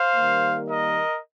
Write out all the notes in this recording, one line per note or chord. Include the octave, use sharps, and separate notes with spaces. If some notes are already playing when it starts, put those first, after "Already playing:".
Already playing: C5 F5
D#3 G3 A#3
A#4 D#5